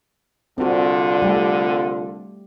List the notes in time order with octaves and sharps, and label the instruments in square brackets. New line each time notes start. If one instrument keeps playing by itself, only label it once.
[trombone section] C2 D3 F4 [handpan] C4 F#4
[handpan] G3 A3 G4